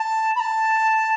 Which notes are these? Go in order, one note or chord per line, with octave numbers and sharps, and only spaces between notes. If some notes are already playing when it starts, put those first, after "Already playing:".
Already playing: A5
B5
A5